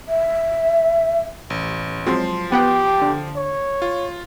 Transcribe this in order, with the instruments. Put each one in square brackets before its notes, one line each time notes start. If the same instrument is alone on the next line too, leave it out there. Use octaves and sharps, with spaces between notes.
[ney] E5
[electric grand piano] A1
[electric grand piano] F3 C6 [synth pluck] F#3 G#3 C4
[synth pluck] B3 F#5 G5 [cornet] G4
[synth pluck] D3
[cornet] C#5
[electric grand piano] F4